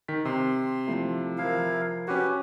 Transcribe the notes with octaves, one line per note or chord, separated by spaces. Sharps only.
D#3 B6
C3 C6
F3 A3 E4
F3 E4 A#4 F5
C#4 F#4 G4 B4